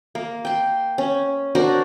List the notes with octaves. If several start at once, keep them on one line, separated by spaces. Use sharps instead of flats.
A#3
G5 C6
C#4
D4 F#4 A#4 C5